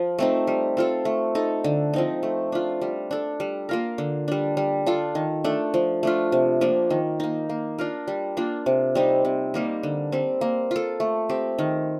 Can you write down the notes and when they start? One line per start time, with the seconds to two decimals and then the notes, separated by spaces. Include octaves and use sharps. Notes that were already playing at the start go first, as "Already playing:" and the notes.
Already playing: F3
0.19 A3 C4 D#4
0.47 G3
0.77 C4 F4 A4
1.05 A3
1.35 D#4 A4
1.64 D3
1.94 F3 C4 D#4
2.23 A3
2.52 D4 F4
2.81 G3
3.11 D4 A4
3.40 G3
3.69 A#3 F4 A#4
3.98 D3
4.28 G3 D4
4.57 G3
4.86 D4 F4 A4
5.15 D#3
5.44 A3 D4 A4
5.74 F3
6.03 A3 D4 F4
6.32 C3
6.61 F3 A#3 D4
6.90 D#3
7.20 A#3 D#4
7.49 A#3
7.79 D4 F4 A#4
8.08 G3
8.37 A#3 D4 F4
8.66 C3
8.95 G3 C4 D#4
9.25 C3
9.54 G3 A#3 D#4
9.83 D3
10.12 G3 C4
10.41 A#3
10.71 F4 A4
11.00 A3
11.29 C4 G4
11.59 D#3